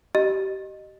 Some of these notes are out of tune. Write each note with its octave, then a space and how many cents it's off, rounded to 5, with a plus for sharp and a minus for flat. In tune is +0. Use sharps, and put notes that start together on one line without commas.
G4 -25 D#5 -15